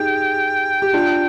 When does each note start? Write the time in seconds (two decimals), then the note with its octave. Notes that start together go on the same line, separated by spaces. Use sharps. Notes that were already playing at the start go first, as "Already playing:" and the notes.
Already playing: D#4 G4 G#4 G5
0.82 G4
0.94 D4 F4